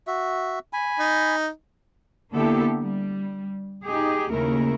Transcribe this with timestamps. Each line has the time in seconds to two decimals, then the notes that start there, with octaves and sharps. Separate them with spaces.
0.07 F#4 E5
0.73 G#5 B5
0.99 D#4
2.33 D3 A#3 B3 E4 G4 A4
2.78 G3
3.85 D#4 G4 G#4
4.30 D#2 C#3 A3 A#3 E4 A#4